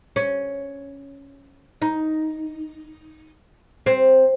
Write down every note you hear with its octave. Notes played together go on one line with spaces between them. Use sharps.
C#4
D#4
C4